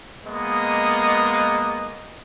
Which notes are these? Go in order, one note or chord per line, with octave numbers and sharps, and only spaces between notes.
G#3 A#3 B3 D#5 D#6